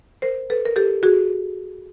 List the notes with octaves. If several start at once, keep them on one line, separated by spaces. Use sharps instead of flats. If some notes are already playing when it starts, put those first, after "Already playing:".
A#4 C5
A4 B4
A#4
G4 A4
F#4 G#4